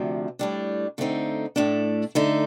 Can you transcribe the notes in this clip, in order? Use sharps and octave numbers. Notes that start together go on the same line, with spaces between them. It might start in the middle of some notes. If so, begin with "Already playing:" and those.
Already playing: D2 C3 F3
A2 G3 D4
D3 A3 C4 D#4
A2 A3 D4
D3 A3 D#4